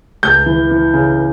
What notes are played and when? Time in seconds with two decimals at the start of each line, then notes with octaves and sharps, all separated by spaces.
0.23 C#2 G6
0.46 E3
0.71 E3
0.94 C#3